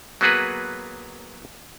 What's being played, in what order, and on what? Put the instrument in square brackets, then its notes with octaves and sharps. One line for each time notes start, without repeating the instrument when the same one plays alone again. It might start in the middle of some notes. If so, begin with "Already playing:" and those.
[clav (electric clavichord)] F#3 A#3 B3 F#4 G#4 B4